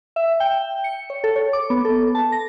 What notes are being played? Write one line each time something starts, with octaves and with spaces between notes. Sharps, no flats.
E5
G5
C#7
C#5
A4
C#5
D6
B3
A4
A5
A#6